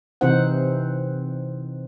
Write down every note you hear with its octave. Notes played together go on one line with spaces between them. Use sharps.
C3 E3 C4 D#4 C5 F#5